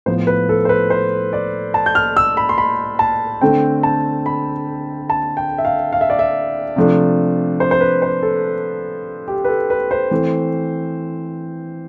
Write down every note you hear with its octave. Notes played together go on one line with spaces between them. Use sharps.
A2 F3 B3 C5
B4
A4
C5
B4
C5
D5
A5
G6
F6
E6
B5
C6
B5
A5
D3 A3 C4 G5
A5
B5
A5
G5
E5
F5
F5
E5
D5
E5
C3 F3 A3 D4
C5
C5
B4
C5
A4
G4
B4
A4
B4
C5
E3 A3 C4